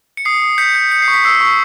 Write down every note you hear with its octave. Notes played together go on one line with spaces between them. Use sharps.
C#7
D#6 C7
D#6
G6 B6 C#7
G6
G6 C#7
C7
C#6
B6
E6 C7
C#6